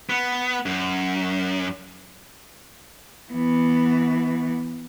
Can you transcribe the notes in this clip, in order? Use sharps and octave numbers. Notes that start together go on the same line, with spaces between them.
B3
F#2
E3 B3